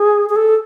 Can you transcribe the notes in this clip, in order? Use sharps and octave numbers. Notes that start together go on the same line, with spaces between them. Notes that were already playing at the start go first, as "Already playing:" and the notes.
Already playing: G#4
G#4
A4